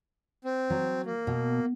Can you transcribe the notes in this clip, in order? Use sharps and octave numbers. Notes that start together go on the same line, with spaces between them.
C4
F#3
A#3
B2